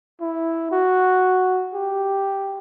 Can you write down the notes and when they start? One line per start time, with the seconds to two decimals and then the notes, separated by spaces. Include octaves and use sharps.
0.21 E4
0.72 F#4
1.74 G4